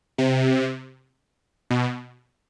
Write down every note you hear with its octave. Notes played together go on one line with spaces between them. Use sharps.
C3
B2